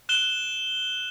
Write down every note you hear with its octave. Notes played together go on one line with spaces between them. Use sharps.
F#6 E7 G7